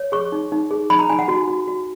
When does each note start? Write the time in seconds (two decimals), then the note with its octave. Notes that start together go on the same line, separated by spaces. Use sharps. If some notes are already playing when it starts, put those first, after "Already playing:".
Already playing: C#5
0.12 G#4 C#6
0.32 D#4
0.52 D#4
0.71 G#4
0.90 D#4 B5
0.99 A#5
1.10 D#4 G#5
1.19 F#5
1.28 F#4
1.48 F#4
1.68 F#4